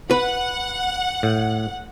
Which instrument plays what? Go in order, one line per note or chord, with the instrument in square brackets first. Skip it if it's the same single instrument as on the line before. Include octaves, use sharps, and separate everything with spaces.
[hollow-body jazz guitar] B4 [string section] F#5
[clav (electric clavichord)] A2